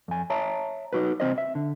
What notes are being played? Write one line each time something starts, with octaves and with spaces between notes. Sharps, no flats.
F2 G#5
C#5 E5 A5 A#5
D#4 F#4 B4
C2 C4 C5 D#5
E5
D3